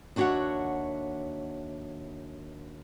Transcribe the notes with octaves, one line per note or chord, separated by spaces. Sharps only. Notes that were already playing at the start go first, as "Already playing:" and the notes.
D#2 D4 F#4 C#5 E5 F#5